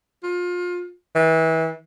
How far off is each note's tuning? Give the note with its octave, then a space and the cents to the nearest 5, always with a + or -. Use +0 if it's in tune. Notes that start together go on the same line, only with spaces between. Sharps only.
F4 +25
E3 -30